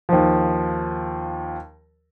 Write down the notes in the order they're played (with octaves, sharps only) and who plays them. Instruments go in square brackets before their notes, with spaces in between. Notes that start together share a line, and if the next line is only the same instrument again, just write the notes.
[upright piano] D#2 F3